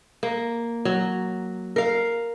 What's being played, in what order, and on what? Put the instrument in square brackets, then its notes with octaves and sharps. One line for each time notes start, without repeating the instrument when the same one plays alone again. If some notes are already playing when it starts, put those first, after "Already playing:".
[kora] A#3
F#3
A#4 F5